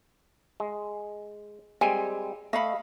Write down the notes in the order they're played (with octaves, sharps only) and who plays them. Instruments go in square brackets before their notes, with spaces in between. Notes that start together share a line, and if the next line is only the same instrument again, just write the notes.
[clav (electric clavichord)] G#3
[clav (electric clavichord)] G3 G#3 C4 [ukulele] G#5
[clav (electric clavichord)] A3 [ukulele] D#5 F5 B5